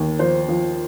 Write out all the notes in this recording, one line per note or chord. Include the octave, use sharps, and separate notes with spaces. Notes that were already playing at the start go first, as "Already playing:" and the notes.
Already playing: D#2
F3 C5
F3